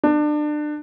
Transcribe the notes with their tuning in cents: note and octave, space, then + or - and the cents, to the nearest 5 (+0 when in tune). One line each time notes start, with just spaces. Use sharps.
D4 +30